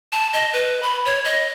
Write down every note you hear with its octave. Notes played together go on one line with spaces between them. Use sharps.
A5
D#5
B4
B5
C#5
D#5